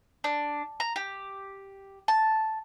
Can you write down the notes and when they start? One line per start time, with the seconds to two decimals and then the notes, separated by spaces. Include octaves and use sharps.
0.24 D4
0.80 A#5
0.96 G4
2.08 A5